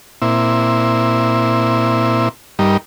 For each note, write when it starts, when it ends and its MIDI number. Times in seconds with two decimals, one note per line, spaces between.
0.22 2.29 46
0.22 2.29 60
0.22 2.29 64
2.59 2.77 43
2.59 2.77 55
2.59 2.77 63
2.59 2.77 70